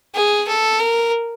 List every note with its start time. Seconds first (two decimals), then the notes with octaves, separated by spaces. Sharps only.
0.15 G#4
0.48 A4
0.81 A#4